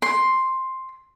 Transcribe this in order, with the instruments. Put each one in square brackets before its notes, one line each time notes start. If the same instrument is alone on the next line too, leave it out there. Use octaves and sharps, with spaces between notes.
[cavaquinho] C6